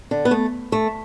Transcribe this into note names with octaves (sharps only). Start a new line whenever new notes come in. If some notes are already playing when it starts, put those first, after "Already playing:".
D3
B3
A3
A3